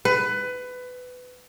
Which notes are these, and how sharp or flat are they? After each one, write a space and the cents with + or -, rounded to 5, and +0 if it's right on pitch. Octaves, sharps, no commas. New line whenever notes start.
B4 +20